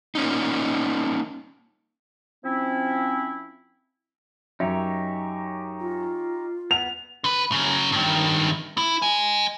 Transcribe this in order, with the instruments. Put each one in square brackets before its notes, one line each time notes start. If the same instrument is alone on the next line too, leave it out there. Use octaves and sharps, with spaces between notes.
[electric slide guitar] A#3 C#4 D#4
[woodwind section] F3 C4 C#4 E4
[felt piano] F#2 E5 [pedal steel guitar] D#4 G4 C#5
[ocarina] F4
[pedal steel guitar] B3 [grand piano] F7
[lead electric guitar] D3 B4
C#3 F#3
G2 D#3
E4
D#5 G#5